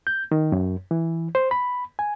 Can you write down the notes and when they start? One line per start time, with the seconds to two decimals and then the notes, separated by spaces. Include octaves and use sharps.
0.07 G6
0.32 D#3
0.52 F#2
0.91 E3
1.35 C5
1.51 B5
1.99 G#5